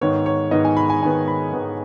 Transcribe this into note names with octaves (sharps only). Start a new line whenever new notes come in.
G#2 D#3 B3 C#5
C#5
G#2 D#3 B3 D#5
G#5
B5
G#5
G#2 D#3 B3 G#5
B5
G#2 D#3 B3